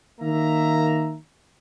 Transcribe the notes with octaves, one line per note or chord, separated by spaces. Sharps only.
D#3 A#3 E5 A#5